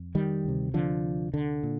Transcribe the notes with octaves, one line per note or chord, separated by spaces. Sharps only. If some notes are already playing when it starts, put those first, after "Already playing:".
Already playing: F2
D#3 G3
D2 C3
D3 F3
D3
A#2